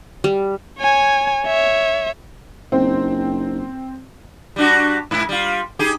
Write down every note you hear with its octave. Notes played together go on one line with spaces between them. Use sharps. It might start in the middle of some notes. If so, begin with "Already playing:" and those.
G3
C#5 G#5
C#5 E5
F#1 C4 D#4 C5
G3 D4 F#4
G#2 E4
G3 F4
D#4 G4 G#4